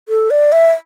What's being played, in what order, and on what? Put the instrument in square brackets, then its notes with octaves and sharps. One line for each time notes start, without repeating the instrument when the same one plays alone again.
[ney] A4
D5
E5